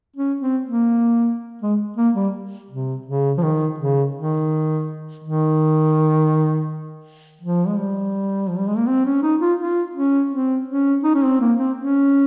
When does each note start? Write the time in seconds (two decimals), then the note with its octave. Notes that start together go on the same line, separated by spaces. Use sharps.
0.16 C#4
0.40 C4
0.65 A#3
1.62 G#3
1.97 A#3
2.15 G3
2.70 C3
3.06 C#3
3.37 F3
3.43 D#3
3.78 C#3
4.16 D#3
5.24 D#3
7.41 F3
7.67 G#3
7.78 G3
8.49 F3
8.58 G3
8.68 G#3
8.77 A#3
8.87 C4
9.05 C#4
9.22 D#4
9.41 F4
9.59 F4
9.95 C#4
10.31 C4
10.68 C#4
11.04 D#4
11.15 C#4
11.23 C4
11.41 A#3
11.58 C4
11.77 C#4